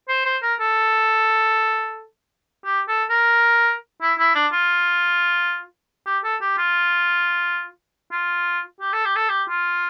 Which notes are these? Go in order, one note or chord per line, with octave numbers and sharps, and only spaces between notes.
C5
C5
A#4
A4
G4
A4
A#4
E4
E4
D4
F4
G4
A4
G4
F4
F4
G4
A4
G4
A4
G4
F4